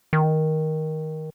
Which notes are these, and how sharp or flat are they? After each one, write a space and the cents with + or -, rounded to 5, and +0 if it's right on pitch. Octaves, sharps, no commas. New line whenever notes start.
D#3 +10